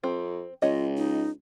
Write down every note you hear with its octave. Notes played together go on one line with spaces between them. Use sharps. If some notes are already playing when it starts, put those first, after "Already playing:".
F2 C4
C#2 F4 C#5 D#5
D#4